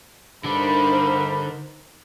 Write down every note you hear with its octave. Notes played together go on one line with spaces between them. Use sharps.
G2 D3 D4 D#4 A#4 C5 B5